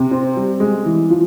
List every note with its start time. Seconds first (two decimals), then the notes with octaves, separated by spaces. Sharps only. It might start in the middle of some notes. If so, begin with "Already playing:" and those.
Already playing: C3
0.11 C4
0.37 G3
0.60 G#3
0.85 E3
1.10 F3